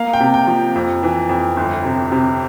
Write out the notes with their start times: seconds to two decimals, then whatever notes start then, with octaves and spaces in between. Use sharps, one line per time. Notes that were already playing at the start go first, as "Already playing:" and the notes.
Already playing: A#3 F5
0.13 G5
0.20 C3
0.34 G5
0.47 F3
0.75 F2
1.03 E3
1.29 F2
1.57 G1
1.84 C3
2.12 C3